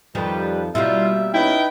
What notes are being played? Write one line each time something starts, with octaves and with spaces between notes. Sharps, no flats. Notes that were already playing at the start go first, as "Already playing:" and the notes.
F2 D#3 F3 G3 B4
B2 G3 A#3 E4 F4 E5
C#4 D#4 E4 B4 G5